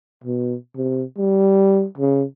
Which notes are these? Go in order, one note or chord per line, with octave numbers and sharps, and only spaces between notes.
B2
C3
G3
C#3